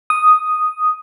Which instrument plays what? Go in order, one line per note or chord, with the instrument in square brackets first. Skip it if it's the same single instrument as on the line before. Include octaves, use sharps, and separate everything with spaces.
[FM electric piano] D#6